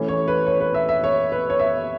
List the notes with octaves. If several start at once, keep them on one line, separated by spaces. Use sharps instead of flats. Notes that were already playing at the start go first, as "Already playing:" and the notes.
Already playing: E3 A3 C#4
C#5
B4
C#5
B4
E5
E5
C#5
B4
C#5
E5